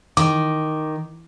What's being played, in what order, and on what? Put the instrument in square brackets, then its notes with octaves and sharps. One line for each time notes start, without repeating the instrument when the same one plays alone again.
[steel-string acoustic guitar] D#3 [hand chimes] D6